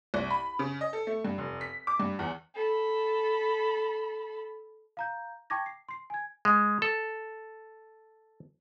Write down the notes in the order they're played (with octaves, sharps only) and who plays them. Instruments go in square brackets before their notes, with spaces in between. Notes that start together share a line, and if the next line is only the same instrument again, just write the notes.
[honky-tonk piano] C2
B5
C#3
D#5
A4
A3
G2
F1
B6
D6
G2
E2
[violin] A4 B5
[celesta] F5 A#5 G6
G5 A5 C#6 D6 G#6 A#6
C7
C6 C7
G#5 G#6
[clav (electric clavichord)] G#3
A4